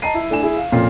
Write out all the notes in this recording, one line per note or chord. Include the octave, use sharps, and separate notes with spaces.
D#5 A5 A#5 C7 D#7
E4
A3 D4 E4 G#5 E7
E4 G#4
F5
F2 A#2 C#4 F4 C7